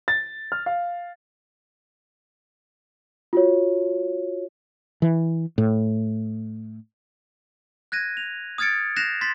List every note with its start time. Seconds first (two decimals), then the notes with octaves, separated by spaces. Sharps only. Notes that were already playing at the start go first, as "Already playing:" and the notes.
0.08 A6
0.52 F6
0.66 F5
3.33 F4 F#4 C#5
5.02 E3
5.58 A2
7.92 F#6 G#6 A#6 D#7
8.17 F7
8.58 D#6 F6 G#6 A6 C#7 D7
8.96 F#6 G6 A#6 C7 E7 F7
9.21 C6 A6 B6